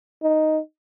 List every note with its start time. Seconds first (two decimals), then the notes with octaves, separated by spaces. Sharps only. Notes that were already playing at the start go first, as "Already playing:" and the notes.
0.23 D#4